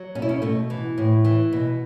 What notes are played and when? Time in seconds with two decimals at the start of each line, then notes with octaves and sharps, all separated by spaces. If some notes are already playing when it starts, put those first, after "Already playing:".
Already playing: F#3
0.15 B2 C#4
0.22 E4
0.29 C#4
0.42 B2 A3
0.70 E3
0.98 A2
1.25 E3
1.53 B2